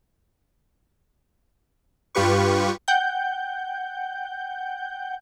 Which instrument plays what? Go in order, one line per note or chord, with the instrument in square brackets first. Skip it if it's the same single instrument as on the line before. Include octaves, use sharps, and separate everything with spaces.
[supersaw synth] G2 F4 G4 B4 C#6
[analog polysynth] F#5 G5 G6